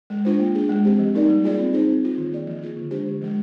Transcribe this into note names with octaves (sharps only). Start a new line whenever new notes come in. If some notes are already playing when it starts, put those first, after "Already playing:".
G#3
D4 F4 C5
A#3
D4 G#4
G#3
C4 G4 C5
F3
A#3 D#4 A#4 D5
G3
A#3 F4 G#4 D5
C4
D#4 G#4 C5
C4
F4 C5
D#3
A#3 F4 G#4 D5
F3
A#3 F4 G#4
D3
G#3 D4 G4 C5
D3
F3 G#3